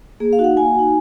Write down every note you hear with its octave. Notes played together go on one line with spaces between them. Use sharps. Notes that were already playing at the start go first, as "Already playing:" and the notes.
A#3 G#4
F5
D#4 F#4
F#5
A#3 G#5
D#4 F#4